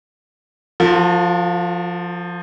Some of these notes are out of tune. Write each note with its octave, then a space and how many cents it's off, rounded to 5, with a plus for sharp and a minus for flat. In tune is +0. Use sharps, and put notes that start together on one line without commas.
F3 +0 F#4 -40 A4 +40